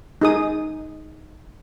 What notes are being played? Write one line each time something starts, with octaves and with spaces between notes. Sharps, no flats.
D#4 G#4 D#6